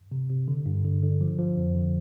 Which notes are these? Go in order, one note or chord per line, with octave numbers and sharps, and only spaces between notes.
C3
C3
D3
G2
D3
D3
F3
F3
F2
D3